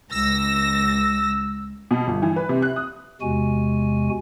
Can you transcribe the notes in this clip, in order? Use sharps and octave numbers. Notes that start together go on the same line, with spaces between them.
C#2 E6 A#6
B2
G1
E3
B4
C3
F#6
D#6
E2 C3 G#3 F#4 G#5